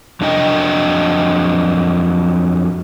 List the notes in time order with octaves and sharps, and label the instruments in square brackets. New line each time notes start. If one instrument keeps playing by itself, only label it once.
[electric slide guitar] F2 F#3 D4 D#5 G5